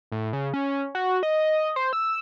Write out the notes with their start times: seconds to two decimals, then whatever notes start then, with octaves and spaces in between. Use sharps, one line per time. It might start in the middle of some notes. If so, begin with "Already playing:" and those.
0.12 A2
0.33 C#3
0.54 C#4
0.95 F#4
1.23 D#5
1.76 C5
1.93 E6